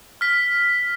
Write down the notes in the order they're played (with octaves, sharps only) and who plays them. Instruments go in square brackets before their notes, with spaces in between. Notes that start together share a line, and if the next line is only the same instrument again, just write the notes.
[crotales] F6 B6